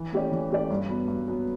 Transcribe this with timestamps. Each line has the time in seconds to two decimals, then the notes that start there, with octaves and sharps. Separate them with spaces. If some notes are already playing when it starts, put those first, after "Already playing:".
Already playing: E3
0.12 A3 C#4 G4 D5
0.31 E3
0.50 A3 C#4 G4 D5
0.70 G2
0.89 F#3 B3
1.08 G2
1.28 F#3 B3